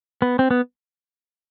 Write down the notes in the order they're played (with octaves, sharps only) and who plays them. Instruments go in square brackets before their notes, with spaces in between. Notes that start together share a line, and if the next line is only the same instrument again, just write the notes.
[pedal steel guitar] B3
C4
B3